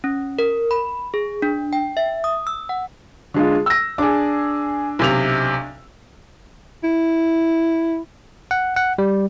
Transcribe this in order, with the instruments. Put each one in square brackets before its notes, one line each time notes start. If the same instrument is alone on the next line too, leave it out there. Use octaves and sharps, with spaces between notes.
[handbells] C#4
A#4
B5
G#4
D4
G5
E5
D#6
E6
F#5
[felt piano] D3 G#3 F4
E6 A#6
[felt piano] D4 [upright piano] G#4 D6
[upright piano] B1 C3 F7
[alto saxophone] E4
[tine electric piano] F#5
F#5
G3